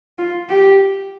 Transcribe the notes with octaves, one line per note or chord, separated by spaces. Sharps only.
F4
G4